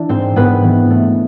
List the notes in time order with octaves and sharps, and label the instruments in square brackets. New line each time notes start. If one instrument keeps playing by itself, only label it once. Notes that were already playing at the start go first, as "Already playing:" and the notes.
Already playing: [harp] E3 D4 D5
G#2 C4 C5
G#2 B3 B4
E3
A3